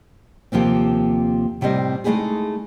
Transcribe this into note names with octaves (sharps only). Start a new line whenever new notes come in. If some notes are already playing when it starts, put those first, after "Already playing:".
D#2 C3 F3 A#3 C4
A2 C3 G3 C4 D#5
G#3 A3 C#4 D#4 E4 G#4